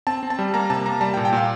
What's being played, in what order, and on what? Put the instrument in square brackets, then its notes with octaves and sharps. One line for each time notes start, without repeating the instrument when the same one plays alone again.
[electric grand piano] C4 A5
C4
A5
G3
A#3 A#5
C3 A5
A#3 A#5
G3 A5
G5
A#2
G5
A#2 F5